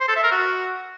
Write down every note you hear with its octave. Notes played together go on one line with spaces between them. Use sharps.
C5
A4
E5
A#4
F#4